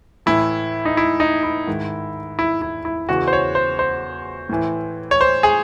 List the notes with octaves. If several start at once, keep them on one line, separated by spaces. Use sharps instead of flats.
A2 E3 E4
D#4
E4
D#4
E4
G#2 D#3
E4
E4
E4
E2 C#3 E3 F#4
C5
C#5
C5
C5
A2 E3
C#5
C5
G#4